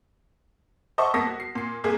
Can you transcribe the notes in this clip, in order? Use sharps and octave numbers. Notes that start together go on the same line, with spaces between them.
C5 D#5 E5 F#5 A5 C#6
A#3 B3 A5 D#6 A#6 B6
F#4
C7
A#2 C7
C2 A#3 G#4